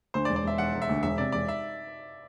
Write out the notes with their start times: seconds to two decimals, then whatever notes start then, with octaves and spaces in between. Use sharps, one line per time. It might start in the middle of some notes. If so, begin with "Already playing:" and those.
0.14 D2 C5
0.25 D5
0.30 E1
0.36 D5
0.44 E1 E5
0.58 E1 F#5
0.74 E1
0.82 E5
0.89 D2
1.03 E1 E5
1.18 C3 D5
1.32 E1 D5
1.48 E5